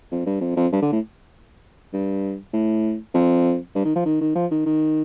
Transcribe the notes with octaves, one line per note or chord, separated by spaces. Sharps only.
F2
G2
F2
F2
G2
D3
A2
G2
A2
F2
G2
D#3
F3
D#3
D#3
F3
D#3
D#3